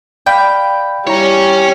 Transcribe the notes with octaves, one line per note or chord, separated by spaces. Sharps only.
D5 F5 G5 B5
G3 C#4 E4 C#5 A#5